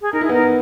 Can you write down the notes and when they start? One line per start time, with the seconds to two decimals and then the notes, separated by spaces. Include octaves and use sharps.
0.02 G#4
0.13 D#4 A#4
0.21 E4 G#4
0.29 B3 D#4 A#4